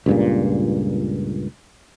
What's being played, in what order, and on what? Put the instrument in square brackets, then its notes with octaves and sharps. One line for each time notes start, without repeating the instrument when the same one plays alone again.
[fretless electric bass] C#2 G2 A#2